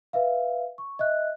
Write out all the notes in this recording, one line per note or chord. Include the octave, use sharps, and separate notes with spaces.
B4 E5 F5
C#6
D#5 E5 F#6